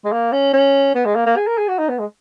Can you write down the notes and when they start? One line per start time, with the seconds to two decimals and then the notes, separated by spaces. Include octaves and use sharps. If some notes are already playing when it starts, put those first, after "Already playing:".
0.05 G#3
0.12 A#3
0.33 C#4
0.54 C#4
0.95 B3
1.06 G#3
1.16 A#3
1.26 A#3
1.37 G#4
1.47 A#4
1.58 G#4
1.68 F#4
1.79 D#4
1.89 B3
1.99 G#3